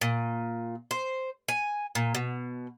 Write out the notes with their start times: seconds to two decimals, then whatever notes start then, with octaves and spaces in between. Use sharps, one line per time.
0.01 A#2
0.91 C5
1.48 G#5
1.95 A#2
2.15 B2